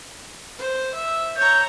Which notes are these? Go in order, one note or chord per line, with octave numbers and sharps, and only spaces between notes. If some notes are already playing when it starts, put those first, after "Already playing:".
C5
E5
C#5 A#5 G6